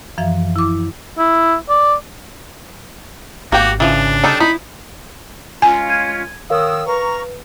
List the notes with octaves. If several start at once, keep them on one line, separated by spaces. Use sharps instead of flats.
F#2 E3 F3 E5 F5
E4 D6
E4
D5
G#1 A#3 F#4 G4 F5 G5
C#3 E3 F3 D4
G3 D#4 A4
D#4 E4 B5
G#3 C#4 F4 G#5
G#6 D#7
D#3 A#4 C#5 F5 D#6 E6
B4 F5 A#5 C#6